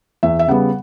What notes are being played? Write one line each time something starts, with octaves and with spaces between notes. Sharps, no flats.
E2 E5
E5
C#3 G3 B3 F#5